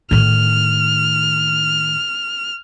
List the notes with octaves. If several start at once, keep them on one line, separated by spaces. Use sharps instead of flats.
A2 D#3 F6